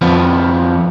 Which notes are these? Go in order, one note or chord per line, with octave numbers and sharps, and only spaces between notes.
F2 F3 B3